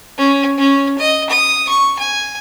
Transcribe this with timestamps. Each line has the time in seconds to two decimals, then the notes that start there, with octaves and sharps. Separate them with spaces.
0.18 C#4
0.58 C#4
0.99 D#5
1.30 D#6
1.69 C#6
1.99 G#5